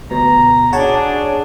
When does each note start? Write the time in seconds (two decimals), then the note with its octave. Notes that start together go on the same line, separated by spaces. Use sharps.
0.11 D2 B2 A#5
0.73 D4 F#4 G#4 C#5 A5